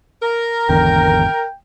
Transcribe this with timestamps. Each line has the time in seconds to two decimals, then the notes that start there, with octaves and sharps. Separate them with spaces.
0.22 A#4
0.69 G#1 E2 D3 G5